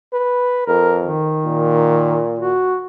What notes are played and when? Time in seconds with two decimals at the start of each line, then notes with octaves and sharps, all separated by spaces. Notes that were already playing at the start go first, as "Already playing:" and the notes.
0.13 B4
0.67 F2 A#4
1.04 D#3
1.45 A#2
2.39 F#4